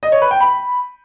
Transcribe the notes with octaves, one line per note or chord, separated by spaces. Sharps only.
D#5
C#5
B4
G5
B5